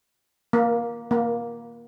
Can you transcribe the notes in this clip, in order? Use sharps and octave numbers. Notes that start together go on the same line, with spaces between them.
A#3
A#3